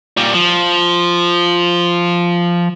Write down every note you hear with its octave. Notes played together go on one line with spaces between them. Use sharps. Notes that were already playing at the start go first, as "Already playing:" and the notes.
A#2 G3
F3